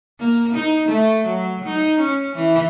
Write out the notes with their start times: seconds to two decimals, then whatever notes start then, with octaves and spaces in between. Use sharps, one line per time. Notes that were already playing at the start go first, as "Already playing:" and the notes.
0.19 A#3
0.54 D#4
0.88 A3
1.25 F#3
1.65 D#4
2.00 C#4
2.35 E3